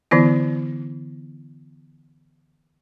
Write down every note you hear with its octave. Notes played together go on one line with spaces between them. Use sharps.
D3 E3 B3 E4